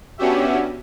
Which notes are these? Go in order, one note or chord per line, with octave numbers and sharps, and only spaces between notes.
B3 C#4 D4 F#4 G4 E5